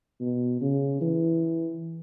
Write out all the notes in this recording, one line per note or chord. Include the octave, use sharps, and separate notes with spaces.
B2
C#3
E3